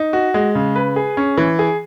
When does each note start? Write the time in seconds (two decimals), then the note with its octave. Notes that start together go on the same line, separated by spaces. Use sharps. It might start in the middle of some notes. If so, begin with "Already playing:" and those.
Already playing: D#4
0.13 F#4
0.34 G#3
0.55 C#3
0.75 B4
0.96 G#4
1.17 C#4
1.37 E3
1.59 G#4